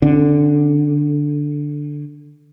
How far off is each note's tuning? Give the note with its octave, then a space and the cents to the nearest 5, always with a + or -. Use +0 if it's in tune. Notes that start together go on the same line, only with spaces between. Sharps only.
D3 +0 C#4 -35